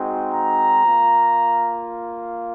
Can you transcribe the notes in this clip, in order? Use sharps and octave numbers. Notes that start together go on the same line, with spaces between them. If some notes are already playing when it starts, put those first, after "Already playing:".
Already playing: G#3 C4 D#4 F#4
A#5
A#3 F4